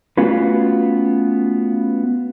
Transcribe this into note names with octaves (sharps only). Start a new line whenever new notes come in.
A3 B3 C#4 F4 F#4 B4